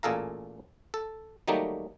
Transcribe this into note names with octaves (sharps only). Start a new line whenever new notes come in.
A1 A#2 G#4 A4 F5 A#5
A4
D#3 F#3 G3 A3 A#3 D#4